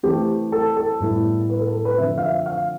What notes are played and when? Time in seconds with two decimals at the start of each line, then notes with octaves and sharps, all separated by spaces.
0.03 E3 A3 C4 G4
0.52 A4
0.77 A4
1.00 A2 G3 B3 E4
1.50 B4
1.61 A4
1.74 A4
1.85 B4
1.98 D3 F3 C4 E5
2.18 F5
2.22 E5
2.46 F5